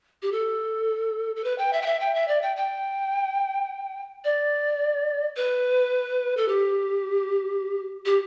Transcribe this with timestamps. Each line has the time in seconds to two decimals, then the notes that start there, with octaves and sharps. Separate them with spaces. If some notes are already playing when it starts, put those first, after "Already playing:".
0.22 G4
0.32 A4
1.36 A4
1.44 B4
1.58 G5
1.73 E5
1.82 G5
1.86 E5
2.00 G5
2.15 E5
2.28 D5
2.42 G5
2.56 G5
4.24 D5
5.36 B4
6.37 A4
6.48 G4
8.05 G4